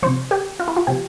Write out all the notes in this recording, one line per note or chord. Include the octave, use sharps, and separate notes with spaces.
C3 F3 C5
G4
F4
E4
F4
C3 F3 G4